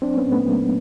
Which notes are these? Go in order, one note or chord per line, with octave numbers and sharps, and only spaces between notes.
F#3 C4 D4
B3 C#4
A#2
A3 B3
F#3 A#3